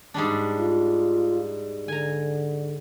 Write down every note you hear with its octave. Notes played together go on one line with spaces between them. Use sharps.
G#2 G3 D4
F4
D3 G#5 A#5